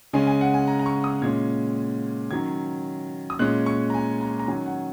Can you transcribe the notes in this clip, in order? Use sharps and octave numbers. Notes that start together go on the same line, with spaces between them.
C#3 G#3 C#4 G#5
G#5
F#5
G#5
A#5
A#5
C#6
D#6
A#2 G#3 C#4 G#6
D#3 F#3 C#4 G#6
D#6
A#2 G#3 C#4 F#6
C#6
A#5
G#5
A#5
A#5
D#3 F#3 C#4 G#5
F#5